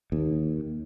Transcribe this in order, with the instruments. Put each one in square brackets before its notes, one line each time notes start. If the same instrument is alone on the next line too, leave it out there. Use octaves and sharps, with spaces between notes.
[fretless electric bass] D#2